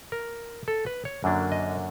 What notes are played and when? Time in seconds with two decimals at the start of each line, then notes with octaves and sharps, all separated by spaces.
0.12 A#4
0.68 A4
0.86 B4
1.05 C#5
1.24 F#2 D3 F#3 A#3 D4
1.52 D#5